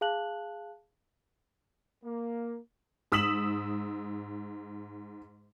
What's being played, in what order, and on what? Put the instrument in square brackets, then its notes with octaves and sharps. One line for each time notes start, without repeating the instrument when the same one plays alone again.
[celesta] G#4 F5 A5 F#6 F#7
[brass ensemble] A#3
[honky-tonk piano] G#2 D#6 E6 B6 E7 F#7